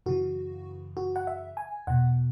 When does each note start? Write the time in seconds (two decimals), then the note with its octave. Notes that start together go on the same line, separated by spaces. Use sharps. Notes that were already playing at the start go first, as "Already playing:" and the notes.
0.06 F#2 C#3 E3 F#4
0.97 F#4
1.16 F#5
1.27 E5
1.57 G#5
1.87 E2 B2 F#5